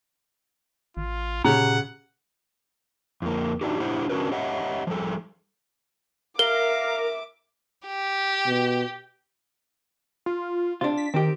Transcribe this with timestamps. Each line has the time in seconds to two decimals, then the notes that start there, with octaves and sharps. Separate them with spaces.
0.97 A1 F4
1.45 A#2 C#3 G4 F#5 A#5
3.22 F2 A#3
3.61 D4 D#4 F#4 G4
3.80 D4 E4 G4 C5 F#5
4.09 C#4 D4 F#4 A#4 B4
4.32 G4 C#5 D#5 E5 F#5
4.87 F3 G3 A4
6.39 A#4 E5 F5 D6 G7
7.88 G4
8.47 B2
10.26 F4
10.81 C3 D4 F4
10.97 B6
11.14 D#3 C4 G4